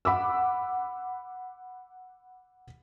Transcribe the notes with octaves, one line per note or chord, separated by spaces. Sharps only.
F#5 B5 D6 E6